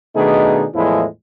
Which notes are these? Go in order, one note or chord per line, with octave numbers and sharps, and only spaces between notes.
B2 D#3 A3 D4 D#4 G#4
E2 A2 F3 G#3 E4